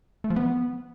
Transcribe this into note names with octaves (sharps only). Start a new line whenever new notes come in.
A3
F3
B3